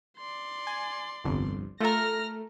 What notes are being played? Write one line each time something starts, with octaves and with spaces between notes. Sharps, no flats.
D5 C6
G#5
G1 C2 F2
A3 F4 A4 A#4 F6 A#6